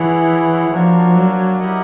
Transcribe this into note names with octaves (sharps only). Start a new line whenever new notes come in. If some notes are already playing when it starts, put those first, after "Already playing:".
Already playing: E3 E4 G#4 C#5 F#5
F3 A#3 D4 F#4 A#4 C#5
F#3
E4 G4 A#4 D#5 F#5